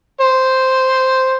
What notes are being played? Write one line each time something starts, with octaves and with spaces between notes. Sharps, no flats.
C5